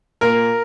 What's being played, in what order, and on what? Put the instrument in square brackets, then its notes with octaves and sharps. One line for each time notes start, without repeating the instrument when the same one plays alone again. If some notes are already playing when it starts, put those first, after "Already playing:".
[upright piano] A#2 A#4